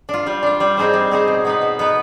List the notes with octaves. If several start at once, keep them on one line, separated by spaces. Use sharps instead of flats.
D4 F4
G3
D4 F4
G3
C4 D#4 G#4 C5
G3
C4 D#4 G#4 C5
B2
B3 D#4 B4
B2
B3 D#4 B4